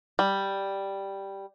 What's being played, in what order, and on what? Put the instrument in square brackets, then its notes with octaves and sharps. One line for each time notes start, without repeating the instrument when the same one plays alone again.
[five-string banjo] G3